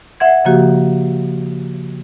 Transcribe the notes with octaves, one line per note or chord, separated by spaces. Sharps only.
E5 F#5 G#6
C#3 F3 A#3 F#4 G4